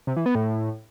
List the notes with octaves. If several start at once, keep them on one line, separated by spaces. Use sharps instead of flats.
C3
E3
B3
A2